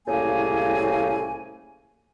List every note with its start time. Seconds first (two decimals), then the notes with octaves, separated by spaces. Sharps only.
0.06 C2 A2 C#3 A#3 G#5